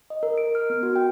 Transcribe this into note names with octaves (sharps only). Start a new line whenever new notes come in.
D#5
A#4
D7
F6
B3
F#4
G5